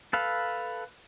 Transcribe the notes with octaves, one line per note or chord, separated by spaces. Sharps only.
A4 B4 F5